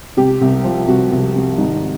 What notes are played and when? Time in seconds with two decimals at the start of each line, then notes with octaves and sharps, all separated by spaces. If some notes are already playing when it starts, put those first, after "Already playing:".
0.17 C3 G4
0.41 C2
0.64 F3
0.88 C2 F#4
1.12 C2
1.35 C3
1.58 G#1 D#4